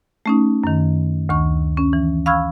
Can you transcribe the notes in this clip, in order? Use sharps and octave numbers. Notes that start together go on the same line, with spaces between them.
A3 C#4 D#4
F#2 D#3
D2 D#3 C#6
C#4
E3
F5 B5 C#6 E6 F6 G#6